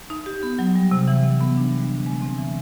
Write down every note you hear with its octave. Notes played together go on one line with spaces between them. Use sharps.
D#4
G4
B3
F#3
G3
C3
E3
C3
B3
D4
G3
D3
G#3
C4
E3